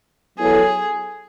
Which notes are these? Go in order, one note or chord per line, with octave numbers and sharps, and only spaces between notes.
F#3 B3 E4 G#4 A4 C#5